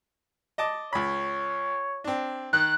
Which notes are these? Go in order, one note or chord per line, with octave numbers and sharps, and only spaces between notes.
D#5 A5 D6
C#2 C#5 B5
C4 D4
D#3 F#6